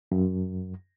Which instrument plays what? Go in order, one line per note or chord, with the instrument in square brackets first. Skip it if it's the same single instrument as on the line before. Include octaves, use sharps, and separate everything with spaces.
[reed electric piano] F#2